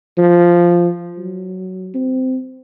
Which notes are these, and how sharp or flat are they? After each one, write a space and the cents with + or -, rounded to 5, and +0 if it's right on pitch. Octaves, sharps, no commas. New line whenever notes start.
F3 -5
F#3 +10
C4 -20